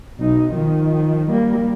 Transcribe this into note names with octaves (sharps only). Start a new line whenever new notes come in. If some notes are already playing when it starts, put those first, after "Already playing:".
B1 D#4
D#3 F3
G3 A#3